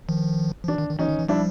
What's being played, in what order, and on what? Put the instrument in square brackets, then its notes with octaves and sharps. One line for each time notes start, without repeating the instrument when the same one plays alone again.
[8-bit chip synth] D#3 F3
F3
[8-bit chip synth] E3 [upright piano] D4
[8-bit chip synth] D#3
D#3
[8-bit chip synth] E3 [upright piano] C#4 D#4
[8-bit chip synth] D#3
E3
[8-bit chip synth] F3 G3 [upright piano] D4 E4